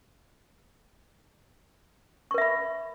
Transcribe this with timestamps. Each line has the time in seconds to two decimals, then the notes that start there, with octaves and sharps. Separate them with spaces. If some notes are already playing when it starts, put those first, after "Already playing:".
2.31 C#6
2.34 A#4
2.38 E5
2.41 B5